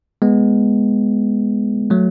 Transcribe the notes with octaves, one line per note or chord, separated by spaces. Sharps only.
G#3 B3
F#3 A3